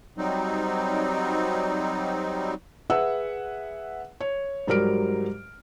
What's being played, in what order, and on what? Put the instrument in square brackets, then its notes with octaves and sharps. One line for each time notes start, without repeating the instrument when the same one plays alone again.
[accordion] F#3 G3 C4 D#4
[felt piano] G#4 B4 E5 F#5 E6
C#5
G#2 F#3 G3 A#4 F6 D7